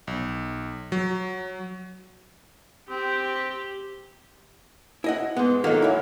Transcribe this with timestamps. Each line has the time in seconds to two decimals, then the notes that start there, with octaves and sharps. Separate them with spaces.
0.07 B1
0.92 F#3
2.90 C4 G4
5.04 E4 D#5 F#5
5.36 G#2 G#3 B3
5.64 D#3 F#3 A#3 D#4 E4 A4 D#5
5.82 G#2 E4 C#5 E5